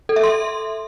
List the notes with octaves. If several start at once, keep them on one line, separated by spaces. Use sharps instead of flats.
A4
E5
C6